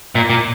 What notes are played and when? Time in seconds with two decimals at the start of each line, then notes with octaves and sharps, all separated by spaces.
0.15 A#2
0.30 A#2